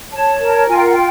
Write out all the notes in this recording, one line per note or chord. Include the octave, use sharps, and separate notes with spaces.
C#5 A5
A#4
F4 G#5
G5
F#5
G5